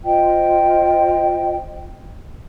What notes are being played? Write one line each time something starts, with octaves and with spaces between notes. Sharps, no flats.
F4 C5 D#5 G5